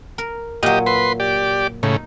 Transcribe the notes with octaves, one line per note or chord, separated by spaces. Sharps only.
A#4
A#2 F#3 G4 D#5
B4 E5 C6
G4 D5
A2 C#3 D#4